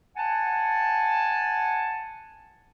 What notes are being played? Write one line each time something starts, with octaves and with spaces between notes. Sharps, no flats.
F#5 G#5 A5